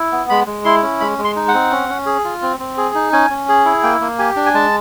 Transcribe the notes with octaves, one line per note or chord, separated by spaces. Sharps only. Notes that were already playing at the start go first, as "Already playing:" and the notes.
Already playing: E4
B3
G#3 B5
G#3
E4 C6
C#4
G#3 B5
G#3
C6
D#4
F#5
C4
C#4
C#4
G#4
F4
C4
C4
G#4
D#4
C#4 G#5
C#4
G#4
E4
A#3 G5
A#3
G4 G#5
D4
G#5
G#3 A5